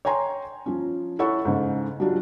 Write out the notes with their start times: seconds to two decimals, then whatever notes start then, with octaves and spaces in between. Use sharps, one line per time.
0.05 C#5 G5 G#5 A#5 C6
0.66 F3 C#4
1.19 E4 A4 C#5 F#5 C#6
1.45 G#2 C#3
2.00 F#3 G3 D4 F4